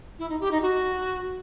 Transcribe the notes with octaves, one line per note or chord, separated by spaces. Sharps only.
E4
D#4
G4
D#4
F#4